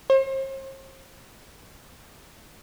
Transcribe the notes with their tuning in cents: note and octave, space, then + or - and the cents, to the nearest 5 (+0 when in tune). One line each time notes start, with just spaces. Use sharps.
C5 +45